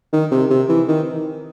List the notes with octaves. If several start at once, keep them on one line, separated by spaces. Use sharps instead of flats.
D#3
C3
C3
E3
D#3